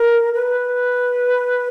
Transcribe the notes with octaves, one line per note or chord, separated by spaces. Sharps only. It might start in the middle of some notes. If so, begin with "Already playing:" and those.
Already playing: A#4
B4